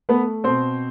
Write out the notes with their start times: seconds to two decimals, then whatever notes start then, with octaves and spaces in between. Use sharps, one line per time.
0.09 A3 B3 B4
0.44 B2 C4 C5